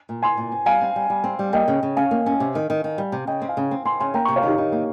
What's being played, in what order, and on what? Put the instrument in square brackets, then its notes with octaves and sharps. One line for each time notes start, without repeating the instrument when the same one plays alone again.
[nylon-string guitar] A#2
[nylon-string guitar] C4 [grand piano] G#5 C6
[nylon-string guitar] A#2
C4
[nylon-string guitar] G3 [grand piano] F5 G#5
[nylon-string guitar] C4
G3
G3
C4
G3
[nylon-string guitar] A#3 [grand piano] D#5 G5
[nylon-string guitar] C#3
C#3
[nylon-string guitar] C#4 [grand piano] F5 G#5
[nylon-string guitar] A#3
C#4
C3
D#3
D#3
D#3
G3
C3
[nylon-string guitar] C#3 [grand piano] D#5 G5
[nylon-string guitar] C4
[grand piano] F5 G#5
[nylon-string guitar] C#3
C4
[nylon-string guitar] C4 [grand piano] G#5 C6
[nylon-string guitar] C#3 [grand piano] G#5 C6
[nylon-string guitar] A#3 [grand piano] G5 A#5
[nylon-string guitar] C3 [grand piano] A#5 C#6
[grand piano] C#5 F5
[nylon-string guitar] D#3 [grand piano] D#4 G4
[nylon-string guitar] D#3 [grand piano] D#4
[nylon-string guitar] A#3